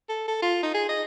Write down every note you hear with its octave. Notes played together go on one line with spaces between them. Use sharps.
A4
A4
F4
D#4
G#4
D#5